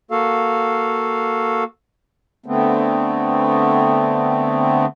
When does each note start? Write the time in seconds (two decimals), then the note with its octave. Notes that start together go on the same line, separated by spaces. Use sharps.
0.11 A#3 F#4 A4 F5
2.46 D3 A3 B3 C4